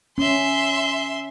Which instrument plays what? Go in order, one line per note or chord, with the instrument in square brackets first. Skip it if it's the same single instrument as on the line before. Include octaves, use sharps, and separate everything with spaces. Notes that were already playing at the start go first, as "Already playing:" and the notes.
[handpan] C#4 [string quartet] E5 C6